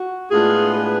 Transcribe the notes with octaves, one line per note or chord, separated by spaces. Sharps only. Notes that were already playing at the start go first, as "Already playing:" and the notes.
Already playing: F#4
A2 G#3 B3 D4 F4 G#4
G#4 B4